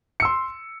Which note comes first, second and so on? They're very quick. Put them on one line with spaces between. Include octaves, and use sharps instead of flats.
C#7 E6 C6